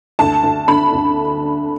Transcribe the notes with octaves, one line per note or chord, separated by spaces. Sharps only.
D2 A5
D2
D3 B5
D2